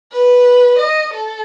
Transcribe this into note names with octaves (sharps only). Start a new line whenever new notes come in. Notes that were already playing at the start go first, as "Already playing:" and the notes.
B4
D#5
A4